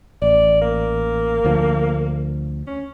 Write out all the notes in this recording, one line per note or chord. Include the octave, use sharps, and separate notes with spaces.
A1 D5
A#3
D2 D3 F3
C#4